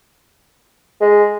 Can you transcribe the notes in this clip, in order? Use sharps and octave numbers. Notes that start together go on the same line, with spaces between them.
G#3